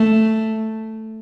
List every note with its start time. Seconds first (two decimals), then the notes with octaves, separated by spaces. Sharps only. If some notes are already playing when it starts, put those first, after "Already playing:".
Already playing: A3